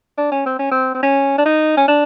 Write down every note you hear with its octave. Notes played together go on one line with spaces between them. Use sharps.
D4
C#4
C4
C#4
C4
C4
C#4
D4
D#4
C#4
D4